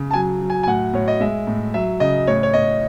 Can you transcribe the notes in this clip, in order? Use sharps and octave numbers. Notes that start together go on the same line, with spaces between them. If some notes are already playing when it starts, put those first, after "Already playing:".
Already playing: C#3
A5
F#3 G#5
F#3
G#5
G#5
A2 F#5
A2 C#5
D#5
G#3 E5
A2
F#3 E5
C#3 D#5
A2 C#5
C#5
A2 D#5